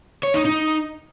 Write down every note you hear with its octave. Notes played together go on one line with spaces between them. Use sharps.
C#5
D#4
D#4